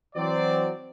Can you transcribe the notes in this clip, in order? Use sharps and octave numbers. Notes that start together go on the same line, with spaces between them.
E3 F#3 C4 D5